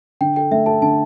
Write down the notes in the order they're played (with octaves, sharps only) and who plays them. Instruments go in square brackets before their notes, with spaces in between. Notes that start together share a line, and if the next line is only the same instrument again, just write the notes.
[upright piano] D3 [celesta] G5
[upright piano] A4 [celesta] G5
[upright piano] A3 [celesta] E5
[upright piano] A4 [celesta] A5
[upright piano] D3 [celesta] A5